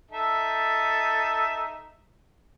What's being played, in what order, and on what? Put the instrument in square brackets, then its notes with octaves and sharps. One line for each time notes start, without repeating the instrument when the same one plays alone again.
[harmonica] D#4 A4 E5